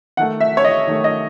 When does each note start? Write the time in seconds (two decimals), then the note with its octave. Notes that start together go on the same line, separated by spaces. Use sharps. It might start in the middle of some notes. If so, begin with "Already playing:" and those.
0.17 D#3 A3 F#5
0.40 E5
0.57 C#5
0.64 D#5
0.87 D#3 A3
1.04 D#5